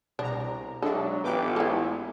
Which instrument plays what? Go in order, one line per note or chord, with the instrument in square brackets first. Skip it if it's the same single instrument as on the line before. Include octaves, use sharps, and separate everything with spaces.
[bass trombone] C2 [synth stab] B2 A#5 [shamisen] D4
[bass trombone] F#3 [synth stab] G#3 D4 [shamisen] A4 [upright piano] D#5 E5
[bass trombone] A1 [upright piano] B3 F4 G4 [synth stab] B4 D6 G6
[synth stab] G#3 [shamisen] E4 A4